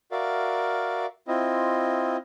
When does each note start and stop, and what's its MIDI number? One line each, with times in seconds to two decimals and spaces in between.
0.12 1.06 66
0.12 1.06 70
0.12 1.06 74
0.12 1.06 76
0.12 1.06 77
1.28 2.17 60
1.28 2.17 64
1.28 2.17 65
1.28 2.17 75